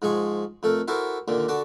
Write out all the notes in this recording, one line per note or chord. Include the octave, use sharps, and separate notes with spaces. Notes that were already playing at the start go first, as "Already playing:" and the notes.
G#2 F3 G#3 G#4 C#6
F2 A3 A4 A#4
E4 F#4 A4 A#4 C5 D6
D#2 A#2 D3 A#3
D3 F#4 D5 A5